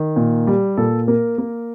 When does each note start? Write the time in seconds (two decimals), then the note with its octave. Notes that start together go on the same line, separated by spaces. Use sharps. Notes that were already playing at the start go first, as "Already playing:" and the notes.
Already playing: D#3
0.16 A#2
0.47 G3
0.77 A#2 A4
1.08 A#3 A#4
1.38 A#3